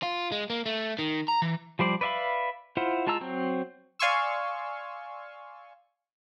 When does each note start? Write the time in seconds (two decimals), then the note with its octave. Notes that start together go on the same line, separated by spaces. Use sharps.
0.03 F4
0.32 G#3
0.50 A#3
0.66 A3
0.99 D#3
1.28 A#5
1.42 E3
1.79 F3 G3 C5 D5
2.01 B4 D5 E5 F5 B5
2.77 E4 F4 C5 F#5
3.07 G#3 F4 A5 A#5 E6
3.21 F#3 C4 C5
3.99 D5 F5 G#5 C6 C#6 E6